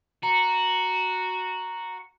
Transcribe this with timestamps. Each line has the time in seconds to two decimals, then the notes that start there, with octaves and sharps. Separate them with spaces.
0.23 F#4 A#5